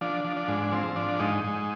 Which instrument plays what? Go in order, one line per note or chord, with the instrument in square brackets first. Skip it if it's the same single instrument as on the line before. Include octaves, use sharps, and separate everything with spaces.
[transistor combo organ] F3 D4
F3
D4
G#2
F3 C4
F3 D4
G#2 D#4
G#2